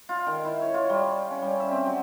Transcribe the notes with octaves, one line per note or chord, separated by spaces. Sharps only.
F4
D#3
E4
C#5
F4
G3
C#4
G3
E5
C4
F#3